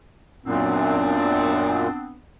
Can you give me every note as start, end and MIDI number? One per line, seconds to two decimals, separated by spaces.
0.46 1.88 42
0.46 1.88 46
0.46 2.17 59
0.46 2.17 60
0.46 2.17 62